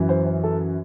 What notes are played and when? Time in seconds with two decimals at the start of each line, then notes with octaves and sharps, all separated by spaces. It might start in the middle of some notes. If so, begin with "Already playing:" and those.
Already playing: F#2 E3
0.09 C5
0.26 C5
0.44 A4